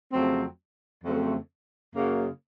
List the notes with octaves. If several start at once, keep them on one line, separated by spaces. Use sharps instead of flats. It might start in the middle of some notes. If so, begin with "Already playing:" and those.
F2 C#3 F#3 A3 C4
F2 C#3 F#3 A3 C4
F#2 C#3 F#3 A#3